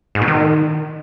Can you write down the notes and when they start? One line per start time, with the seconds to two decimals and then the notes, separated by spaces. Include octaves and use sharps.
0.15 G#2
0.21 B2
0.28 D#3